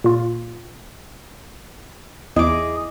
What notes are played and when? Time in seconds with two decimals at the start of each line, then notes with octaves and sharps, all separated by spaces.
0.04 A#2 F4
2.36 E2 E4 G#4 D#5 D6